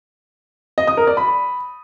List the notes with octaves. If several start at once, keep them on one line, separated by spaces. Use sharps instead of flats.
D#5
D#6
A#4
D5
B5